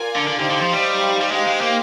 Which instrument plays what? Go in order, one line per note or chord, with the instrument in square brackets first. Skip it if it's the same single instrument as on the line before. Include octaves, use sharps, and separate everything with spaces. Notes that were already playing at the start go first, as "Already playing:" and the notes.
Already playing: [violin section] F4 A#4 D5 G#5
[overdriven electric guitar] D3
D3
[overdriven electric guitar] D3 [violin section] D#4 G4 C5 F5
[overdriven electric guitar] D3
F3
G3
G3
[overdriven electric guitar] G#3 [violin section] D#4 G4 C5 F5
[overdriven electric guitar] G#3
A#3